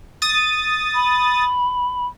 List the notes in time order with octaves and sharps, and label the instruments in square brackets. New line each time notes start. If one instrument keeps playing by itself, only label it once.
[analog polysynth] D#6 A6
[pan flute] B5